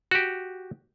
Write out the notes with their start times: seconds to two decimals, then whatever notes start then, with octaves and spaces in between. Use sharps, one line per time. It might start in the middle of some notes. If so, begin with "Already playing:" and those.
0.11 F#4 G4